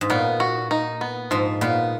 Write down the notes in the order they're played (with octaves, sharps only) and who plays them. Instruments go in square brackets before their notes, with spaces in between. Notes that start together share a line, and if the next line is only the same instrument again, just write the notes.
[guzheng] G#2
[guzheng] A#2 [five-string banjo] B3
[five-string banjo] F#4
D#4
B3
[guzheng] G#2 [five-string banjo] F3
[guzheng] A#2 [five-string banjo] B3